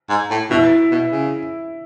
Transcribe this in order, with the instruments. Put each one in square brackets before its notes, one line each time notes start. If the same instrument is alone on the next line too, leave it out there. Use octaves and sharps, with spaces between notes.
[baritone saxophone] G#2
A2
[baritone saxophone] B2 [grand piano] E4
[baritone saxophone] B2
C#3